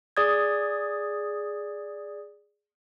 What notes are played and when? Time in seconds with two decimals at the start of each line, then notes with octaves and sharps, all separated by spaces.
0.17 G#4 D5 D#6 G#6